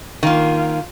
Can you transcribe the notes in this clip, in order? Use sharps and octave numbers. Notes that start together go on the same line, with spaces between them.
D#3 A#3 F4 F5